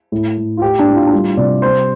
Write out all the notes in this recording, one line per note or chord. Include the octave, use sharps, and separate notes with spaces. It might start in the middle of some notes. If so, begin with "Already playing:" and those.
A2
A2
F4
A2 G4
D4
A2
F4
D4
G3 F4
C3 D5
G3 C5